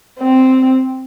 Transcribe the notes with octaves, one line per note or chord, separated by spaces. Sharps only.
C4